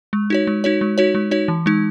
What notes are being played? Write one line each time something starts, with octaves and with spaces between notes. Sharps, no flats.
G#3
D#4 F#4 C#5
G#3
D#4 F#4 C#5
G#3
D#4 F#4 C#5
G#3
D#4 F#4 C#5
E3
G#3 D#4